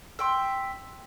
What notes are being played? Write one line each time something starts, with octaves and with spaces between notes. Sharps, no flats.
E5 G5 C6